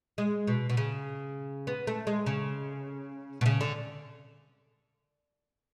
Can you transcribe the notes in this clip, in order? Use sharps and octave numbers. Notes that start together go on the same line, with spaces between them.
G#3
B2
B2
C#3
B3
A3
G#3
C#3
B2
C#3
D3